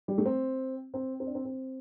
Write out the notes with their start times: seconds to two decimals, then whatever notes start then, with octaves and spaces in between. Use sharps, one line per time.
0.08 G3
0.18 A3
0.26 C4
0.94 C4
1.20 C4
1.27 D4
1.35 C4
1.45 C4